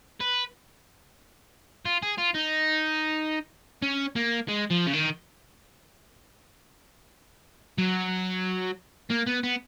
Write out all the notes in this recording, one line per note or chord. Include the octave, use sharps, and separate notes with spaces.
B4
F4
G#4
F4
D#4
C#4
A#3
G#3
F3
C#3
D#3
F#3
A#3
B3
B3